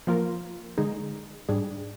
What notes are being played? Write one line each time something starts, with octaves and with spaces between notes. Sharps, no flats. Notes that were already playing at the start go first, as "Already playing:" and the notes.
F3 A#3 F4 A#4
D3 G#3 D#4 G#4
G#2 G3 D4 G#4